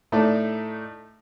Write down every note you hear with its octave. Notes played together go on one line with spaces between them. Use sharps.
A2 A3 D#4 A4 D5